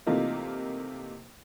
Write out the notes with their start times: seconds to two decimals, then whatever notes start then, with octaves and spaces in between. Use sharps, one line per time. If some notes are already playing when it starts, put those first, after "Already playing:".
0.06 C3 E3 A3 A#3 D#4 F4